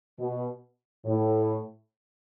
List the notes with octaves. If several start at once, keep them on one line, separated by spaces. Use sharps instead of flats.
B2
A2